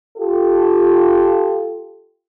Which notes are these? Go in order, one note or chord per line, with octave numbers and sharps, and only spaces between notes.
F4 G4 A4